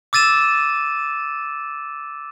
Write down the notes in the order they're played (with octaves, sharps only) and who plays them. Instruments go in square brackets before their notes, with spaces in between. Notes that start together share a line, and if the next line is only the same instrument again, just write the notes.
[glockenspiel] D6 E6 A6 D#7 E7